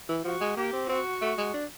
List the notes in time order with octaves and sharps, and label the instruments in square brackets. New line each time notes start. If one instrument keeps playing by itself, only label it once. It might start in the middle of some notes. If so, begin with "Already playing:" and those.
[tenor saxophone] E3
[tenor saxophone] F3 [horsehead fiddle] F#4
[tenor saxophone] G#3
[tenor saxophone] A#3 [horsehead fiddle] G4
[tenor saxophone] C4
[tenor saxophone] C4 [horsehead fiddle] F#4
[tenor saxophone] A3
G#3
D4